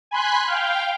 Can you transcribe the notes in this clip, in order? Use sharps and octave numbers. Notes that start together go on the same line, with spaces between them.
G#5 B5 C6 F#6
F5 G5